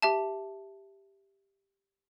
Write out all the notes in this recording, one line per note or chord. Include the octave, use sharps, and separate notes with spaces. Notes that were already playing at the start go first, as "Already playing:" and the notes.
G4 E5 A5